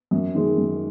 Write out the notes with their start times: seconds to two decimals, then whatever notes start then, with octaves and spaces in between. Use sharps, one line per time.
0.11 F#2
0.35 D#3 G#3
0.57 F#2